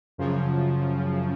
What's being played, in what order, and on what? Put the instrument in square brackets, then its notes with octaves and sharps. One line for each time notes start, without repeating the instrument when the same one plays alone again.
[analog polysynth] F#2 C#3 F3